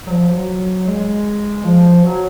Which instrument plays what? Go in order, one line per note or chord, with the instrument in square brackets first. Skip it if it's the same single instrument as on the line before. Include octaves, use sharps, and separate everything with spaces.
[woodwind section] F#3
F3
F#3
G#3
F3
F#3